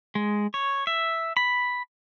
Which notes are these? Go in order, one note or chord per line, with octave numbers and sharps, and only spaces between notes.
G#3
C#5
E5
B5